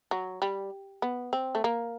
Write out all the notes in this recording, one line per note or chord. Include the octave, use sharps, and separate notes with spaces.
F#3
G3
B3
C4
A3
A#3